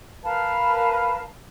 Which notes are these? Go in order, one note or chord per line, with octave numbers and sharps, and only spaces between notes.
A#4 B4 F5 A5